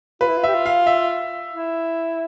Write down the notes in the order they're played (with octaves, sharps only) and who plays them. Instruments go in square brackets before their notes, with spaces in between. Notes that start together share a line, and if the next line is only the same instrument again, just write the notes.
[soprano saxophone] F4 [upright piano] B4
[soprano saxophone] E4
F4
[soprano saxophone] G4 [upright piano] E5
[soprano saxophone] F4
[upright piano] F5
E5
[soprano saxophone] E4